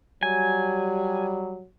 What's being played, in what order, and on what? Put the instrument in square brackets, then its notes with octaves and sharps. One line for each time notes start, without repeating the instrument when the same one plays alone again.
[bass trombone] F#3 [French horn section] G3 [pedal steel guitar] G#5